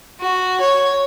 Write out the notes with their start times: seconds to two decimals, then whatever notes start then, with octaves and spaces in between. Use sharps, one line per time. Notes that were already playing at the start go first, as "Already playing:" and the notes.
0.20 F#4
0.60 C#5